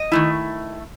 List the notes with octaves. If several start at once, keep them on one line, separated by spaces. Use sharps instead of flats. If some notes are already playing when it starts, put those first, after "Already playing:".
Already playing: D#5
D#3 A3 E4